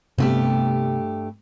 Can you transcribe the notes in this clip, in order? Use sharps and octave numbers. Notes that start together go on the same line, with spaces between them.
G2 C3 A3 B3 C4 G4